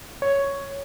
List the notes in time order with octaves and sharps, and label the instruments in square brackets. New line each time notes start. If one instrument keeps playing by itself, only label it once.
[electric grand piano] C#5